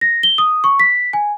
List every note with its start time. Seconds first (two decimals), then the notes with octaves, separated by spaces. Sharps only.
0.01 A#6
0.23 G7
0.38 D#6
0.64 C#6
0.80 B6
1.13 G#5